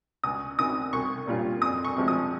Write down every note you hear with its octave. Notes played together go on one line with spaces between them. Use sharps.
C#2 D#6
C3 D#3 D#6
C2 C#6
A#2 G3 C#4 F4
F2 D#6
C#6
C3 F3 G#3
D#6